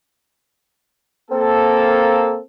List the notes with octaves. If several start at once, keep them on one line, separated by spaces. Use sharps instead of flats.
A#3 C4 A4